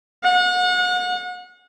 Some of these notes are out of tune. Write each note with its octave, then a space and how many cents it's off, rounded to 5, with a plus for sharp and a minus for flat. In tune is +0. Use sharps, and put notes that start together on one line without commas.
F#5 -35